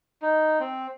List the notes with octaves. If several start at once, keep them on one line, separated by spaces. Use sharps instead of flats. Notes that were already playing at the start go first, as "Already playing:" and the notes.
D#4
C4